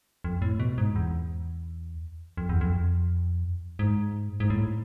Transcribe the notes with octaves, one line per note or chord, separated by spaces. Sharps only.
F2
A2
B2
G#2
E2
F2
E2
F2
G#2
G#2
A2